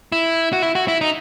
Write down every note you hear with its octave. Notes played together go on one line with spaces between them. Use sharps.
E4
F#4
E4
F#4
E4
D#4